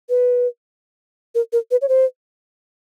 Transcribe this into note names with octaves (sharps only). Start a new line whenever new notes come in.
B4
A#4
A#4
B4
C#5
C5